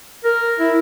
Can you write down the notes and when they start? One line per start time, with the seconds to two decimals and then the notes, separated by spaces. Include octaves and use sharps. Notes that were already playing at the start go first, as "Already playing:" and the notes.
0.24 A#4
0.59 E4